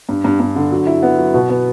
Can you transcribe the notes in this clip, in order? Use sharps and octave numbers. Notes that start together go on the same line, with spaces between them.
G2
G2
G2
D3
F#3
E4
B3
F#3
B2
B3